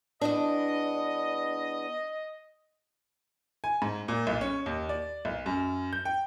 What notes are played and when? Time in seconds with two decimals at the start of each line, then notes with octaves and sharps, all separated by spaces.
0.21 E2 B3 D4 D#5
3.64 G#5
3.82 G#2
4.08 A#2
4.27 B1
4.41 C#4
4.66 D#2
4.89 D5
5.25 B1
5.46 F#2
5.93 G6
6.05 G5